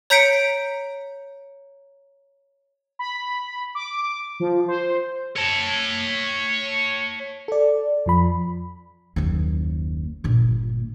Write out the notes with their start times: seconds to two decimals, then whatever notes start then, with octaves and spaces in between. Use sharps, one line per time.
0.10 C#5 A#5 G6 B6 C#7 D7
2.99 B5
3.75 D6
4.40 F3
4.68 C5
5.36 C#5 A5
7.48 A4 D5
8.06 F2 F3 B5
9.16 F#1 D#2
10.24 G1 A#2